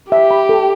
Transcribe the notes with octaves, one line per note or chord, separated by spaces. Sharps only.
G4 E5
B5
A4